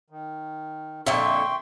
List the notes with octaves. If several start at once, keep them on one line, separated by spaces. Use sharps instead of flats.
D#3
F2 A#2 D3 E5 G5 C6 C#6